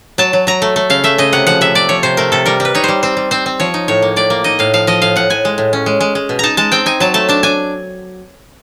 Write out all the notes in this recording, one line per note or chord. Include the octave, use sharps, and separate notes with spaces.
F#3 A5
F#3
F#3 A#5
A3
A3
C#3 F5
A3 E5
C#3 D#5
C3 F#5
F3 F#5
C3 E5
C3 D5
F3 C#5
C3 C5
A3 A#4
C3 A4
G3 A#4
G3 B4
D#4 C#5
G3 C5
C4 C5
G3
C4 C5
C4
F3 C#5
D#4
A2 C#5
A#3
A2 D5
A#3
D#4 D#5
A2 F5
F3 F5
F3 D#5
A2 F5
A2 F#5
A2 G#5
G#3
A2
C#4
G#3
G#3
G#3
B2
D#4 A5 A#5
G#3 A5
C4 G5
D#4 G#5
F#3 A5
A3 A5
D4 A5
D4 G#5